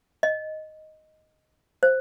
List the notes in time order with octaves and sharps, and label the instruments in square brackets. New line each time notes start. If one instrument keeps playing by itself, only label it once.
[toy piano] D#5
C5